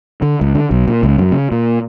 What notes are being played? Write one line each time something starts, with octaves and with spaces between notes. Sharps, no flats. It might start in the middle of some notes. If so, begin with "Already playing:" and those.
D3
C#2
D3
B1
A#2
C#2
F#2
C#3
A#2